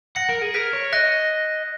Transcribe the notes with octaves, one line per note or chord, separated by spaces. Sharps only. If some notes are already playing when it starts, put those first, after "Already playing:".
F#5 A#6 C#7
A#4
G#4
A#4 G#6 B6
C#5
D#5 F#6 A#6